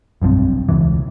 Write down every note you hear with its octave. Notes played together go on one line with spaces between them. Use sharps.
F1 B1 G2 C4
E1 C#2 E3